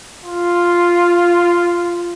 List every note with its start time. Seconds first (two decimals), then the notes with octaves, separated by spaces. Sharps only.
0.24 F4